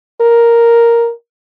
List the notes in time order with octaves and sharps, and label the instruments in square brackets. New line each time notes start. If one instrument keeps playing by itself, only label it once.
[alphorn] A#4